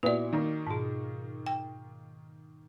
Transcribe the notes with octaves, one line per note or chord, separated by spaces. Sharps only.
A#2 B3 E4 F#4 D5
D#3 A#3 D#4
G#2 B2
G5